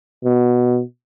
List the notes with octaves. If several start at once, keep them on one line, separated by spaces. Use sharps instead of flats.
B2